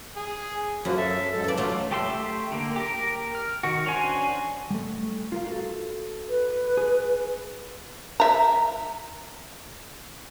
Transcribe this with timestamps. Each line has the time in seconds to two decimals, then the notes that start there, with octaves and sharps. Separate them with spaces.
0.16 G#4
0.85 F#2 F3 F#3 A#3
0.97 A4 E5
1.32 G#2 A4
1.44 C#3 E3 A4 D5
1.57 F#3 A3 F4
1.91 A3 G4 E5 C6 E6
2.52 D3 A#3
2.76 G4 A#4
3.35 F6
3.63 D#3 F#4
3.86 C#4 D4 F#4 C5 G#5
4.70 G3 A3
5.32 F4 A#4 F5
5.48 F#4 A4
6.29 B4
6.77 G#4
8.20 E5 A#5